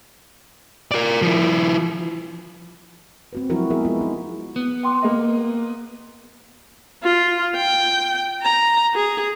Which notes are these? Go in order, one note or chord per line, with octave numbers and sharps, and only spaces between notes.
A#4 D5
F3 E4
C4 F#4 B4
F3 F#3 G#3 E4 F#4 A#4
G#3 B3 G#4 A#4 E5
B3 E4 F4
B3 D#4
B3
G5 C6 D6
A#3 D#5
F4
G5
A#5
G#4